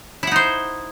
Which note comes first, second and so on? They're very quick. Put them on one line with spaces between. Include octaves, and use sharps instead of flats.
E4 F#5 D#4 C5